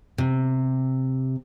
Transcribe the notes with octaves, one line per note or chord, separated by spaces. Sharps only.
C3